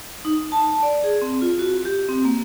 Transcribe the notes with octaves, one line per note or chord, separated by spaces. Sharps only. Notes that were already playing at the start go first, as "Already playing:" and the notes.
D#4
A5
D5
G#4
C4
F4
F#4
G4
C4
A#3